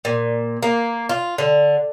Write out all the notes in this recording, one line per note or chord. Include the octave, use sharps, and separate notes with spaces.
A#2
A#3
F4
D3